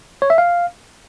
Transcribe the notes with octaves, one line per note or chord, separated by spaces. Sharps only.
C#5
E5
F5